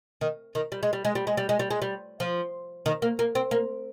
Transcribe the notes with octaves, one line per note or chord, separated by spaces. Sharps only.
D#3
D#3
G3
G#3
G3
G#3
G3
G#3
G3
G#3
G3
G#3
G3
F3
D#3
A#3
A#3
C4
A#3